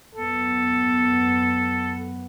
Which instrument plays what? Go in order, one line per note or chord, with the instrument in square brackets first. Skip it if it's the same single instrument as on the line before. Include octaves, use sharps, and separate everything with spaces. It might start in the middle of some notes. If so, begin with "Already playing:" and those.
[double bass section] F#2 B3 [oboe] A4